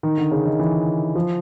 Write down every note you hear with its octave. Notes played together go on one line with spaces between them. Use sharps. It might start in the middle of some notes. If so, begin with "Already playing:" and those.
D#3
D3
C#3
D#3
E3
F3